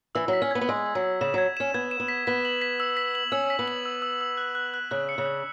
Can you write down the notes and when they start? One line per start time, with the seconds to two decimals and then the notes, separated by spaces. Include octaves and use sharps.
0.15 E3 E6
0.28 F#3
0.33 B6
0.42 C#4
0.51 B3 G#6
0.61 B3
0.69 G#3 E6
0.86 E6
0.95 F#3
1.04 E6
1.21 C#3 E7
1.34 F#3 G#6
1.57 C#4 E7
1.74 B3 G#6
1.91 E7
2.00 B3
2.08 B6
2.27 B3 B6
2.45 F#7
2.62 B6
2.80 E6
2.97 B6
3.15 F#7
3.32 C#4 E6
3.50 B6
3.59 B3
3.68 F#7
3.85 E6
4.02 E6
4.21 E6
4.37 F#6
4.55 F#6
4.74 F#6
4.91 C#3 F#6
5.09 C#7
5.18 C#3
5.26 F#6